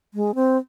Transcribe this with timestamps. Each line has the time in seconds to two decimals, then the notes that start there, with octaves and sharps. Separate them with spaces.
0.14 G#3
0.35 C4